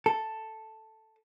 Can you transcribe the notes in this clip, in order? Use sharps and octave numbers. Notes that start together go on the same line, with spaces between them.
A4